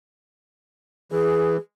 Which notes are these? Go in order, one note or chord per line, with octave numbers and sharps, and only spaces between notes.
E3 G#4